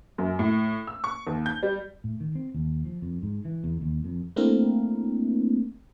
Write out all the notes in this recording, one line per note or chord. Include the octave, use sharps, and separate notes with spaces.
F#2
A2
E6
C#6
D#2
G6
G3
A2
D#3
C4
D#2
F3
F2
G#2
E3
E2
D#2
F2
A3 A#3 C4 D4 E4 A#4